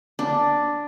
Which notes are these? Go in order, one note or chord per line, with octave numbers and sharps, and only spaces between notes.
D4